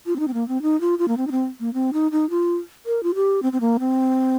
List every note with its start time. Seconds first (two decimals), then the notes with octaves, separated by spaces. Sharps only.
0.06 F4
0.16 C4
0.19 D#4
0.28 C4
0.34 A#3
0.48 C4
0.62 D#4
0.81 F4
0.99 F4
1.08 A#3
1.17 C4
1.27 D#4
1.31 C4
1.60 A#3
1.74 C4
1.93 D#4
2.12 D#4
2.30 F4
2.86 A#4
3.03 F4
3.15 G4
3.43 C4
3.53 C4
3.61 A#3
3.80 C4